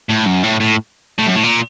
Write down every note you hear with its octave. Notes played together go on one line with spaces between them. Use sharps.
A2
F#2
A2
A2
A2
F#2
A2
A#2